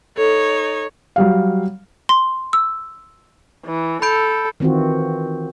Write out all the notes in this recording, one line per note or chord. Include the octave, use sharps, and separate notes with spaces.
D#4 A4 C#5
F#3 G3 F5
C6
E6
E3
A4 B5 G6 D7
D#3 E3 C4 F4 F#4